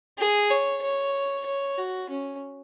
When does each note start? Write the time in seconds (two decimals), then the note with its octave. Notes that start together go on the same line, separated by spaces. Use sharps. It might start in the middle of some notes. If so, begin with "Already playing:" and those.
0.19 G#4
0.50 C#5
0.82 C#5
1.45 C#5
1.78 F#4
2.10 C#4